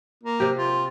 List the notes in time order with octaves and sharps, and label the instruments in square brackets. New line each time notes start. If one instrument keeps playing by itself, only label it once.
[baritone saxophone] A#3
[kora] C3 G4
[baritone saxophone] F4